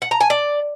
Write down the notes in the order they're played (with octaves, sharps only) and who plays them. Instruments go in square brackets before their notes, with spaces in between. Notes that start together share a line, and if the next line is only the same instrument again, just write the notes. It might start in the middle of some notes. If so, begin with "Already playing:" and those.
[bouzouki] F#5
A#5
G#5
D5